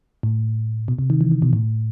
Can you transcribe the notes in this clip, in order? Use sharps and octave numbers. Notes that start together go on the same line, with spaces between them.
A2
B2
C3
D#3
E3
D#3
B2
A2